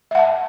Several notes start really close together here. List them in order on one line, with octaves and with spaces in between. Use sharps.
E5 F#5 A5